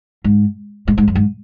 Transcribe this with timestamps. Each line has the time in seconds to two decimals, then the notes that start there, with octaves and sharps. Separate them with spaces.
0.24 G#2
0.88 G#2
0.98 G#2
1.08 F#2
1.15 G#2